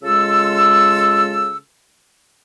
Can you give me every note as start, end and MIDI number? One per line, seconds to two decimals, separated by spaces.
0.03 1.56 49
0.03 1.56 56
0.03 1.56 65
0.03 1.56 69
0.03 1.56 88